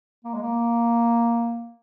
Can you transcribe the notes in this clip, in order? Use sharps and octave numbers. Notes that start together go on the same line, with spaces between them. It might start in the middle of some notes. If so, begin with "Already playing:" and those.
A#3
G#3
A#3